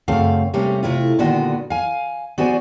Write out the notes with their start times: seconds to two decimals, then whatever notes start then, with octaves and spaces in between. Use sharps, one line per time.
0.08 F#2 C#3 A3 C4 F5
0.53 C3 G3 A3 A#3 C#4
0.83 C3 A3 E4 F4
1.19 A#2 D3 D#3 G#3 B3 F#4
1.70 F5 G#5
2.38 B3 F#4 C5 D5 G#5